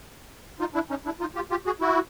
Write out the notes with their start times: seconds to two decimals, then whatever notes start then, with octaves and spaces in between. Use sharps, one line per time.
0.60 D#4 F4
0.74 D4 E4
0.90 C#4 D#4
1.05 D4 E4
1.20 D#4 F4
1.35 F4 G4
1.50 F4 G4
1.66 F#4 G#4
1.81 E4 F#4